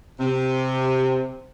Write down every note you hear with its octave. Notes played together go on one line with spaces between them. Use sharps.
C3